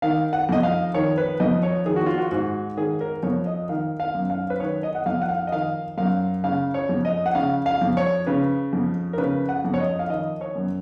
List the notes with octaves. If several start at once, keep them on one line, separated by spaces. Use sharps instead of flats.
D#3 F5
F#5
F2 D#5
F5
D#3 C#5
B4
F2 D#5
C#5
D#3 G#4
F#4
F4
F#4
G#2 F#4
D#3 G#4
A#4
F2 C#5
D#5
D#3 F5
F5
F#2
F5
B4
D#3 C#5
D#5
F#5
F2 F5
F#5
F5
D#5
D#3 F5
F#2 F5
C#3 F5
C#5
F2
D#5
F#5
C#3 F5
F5
F2
C#5
C#3 B4
F2
A#4
C#3 B4
F#5
F2
C#5
D#5
F5
D#3 D#5
C#5
F#2